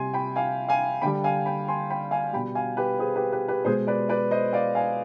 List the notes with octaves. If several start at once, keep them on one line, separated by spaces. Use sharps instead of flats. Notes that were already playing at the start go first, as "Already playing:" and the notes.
Already playing: C3 G3 G#5 C6
G5 B5
F5 G#5
F5 G#5
D3 G3 G5 B5
F5 G#5
G5 B5
G#5 C6
G5 B5
F5 G#5
B2 G3 G5 B5
F5 G#5
G4 B4
G#4 C5
G4 B4
G4 B4
G4 B4
B2 G#3 G#4 C5
B4 D5
B4 D5
C5 D#5
D5 F5
F5 G#5